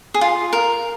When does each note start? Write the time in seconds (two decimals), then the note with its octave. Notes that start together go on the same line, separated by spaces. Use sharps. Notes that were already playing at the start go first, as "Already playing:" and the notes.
0.14 G#4
0.21 F4
0.53 A#4